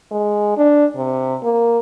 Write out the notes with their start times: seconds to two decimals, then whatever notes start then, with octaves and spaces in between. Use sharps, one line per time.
0.11 G#3
0.57 D4
0.96 C3
1.43 A#3